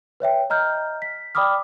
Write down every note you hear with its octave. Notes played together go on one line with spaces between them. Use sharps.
B4 C#5 E5 G5
D#5 A#5 F6 G6
B6
D5 G5 B5 D6 D#6 F6